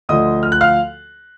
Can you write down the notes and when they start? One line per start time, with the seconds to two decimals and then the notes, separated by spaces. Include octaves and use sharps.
0.09 D2 D3 F3 D#5 D#6
0.43 F6
0.52 F#6
0.61 F5 F6